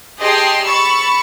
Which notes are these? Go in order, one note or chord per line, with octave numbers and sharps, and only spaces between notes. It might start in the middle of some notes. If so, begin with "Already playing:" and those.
G4 G#4 D#5 G5 A5 C6
B5 C#6 E6 A6